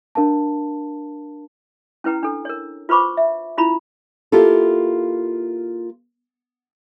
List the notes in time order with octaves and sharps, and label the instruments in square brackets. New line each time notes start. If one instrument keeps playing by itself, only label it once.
[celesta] D4 A#4 F5 A5
[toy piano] C#4 E4 B4 G5 A#5
D4 A4
A#4 C#5
F4 B4 C5 B5 C#6 D6
E5
C#4 E4 F4 A#5 B5
[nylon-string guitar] A#3 E4 F4 G4 A4